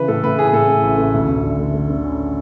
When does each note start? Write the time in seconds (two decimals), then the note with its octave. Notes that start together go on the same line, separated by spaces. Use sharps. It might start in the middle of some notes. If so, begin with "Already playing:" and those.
Already playing: C#3 E3 B4
0.08 A2 A4
0.23 A2 B4
0.38 A3 G#4
0.48 G#4
0.53 A2 A4
0.68 A2
0.83 A1
0.98 A3
1.14 D2
1.28 D2
1.44 D3
1.59 A3
1.74 A3
1.90 D3
2.05 C#4